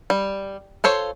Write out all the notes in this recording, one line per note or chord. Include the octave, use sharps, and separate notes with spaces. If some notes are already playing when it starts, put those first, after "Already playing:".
G3
F4 A4 C5 C#5